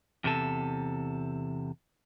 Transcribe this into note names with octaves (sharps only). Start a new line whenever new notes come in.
E2 C3 A4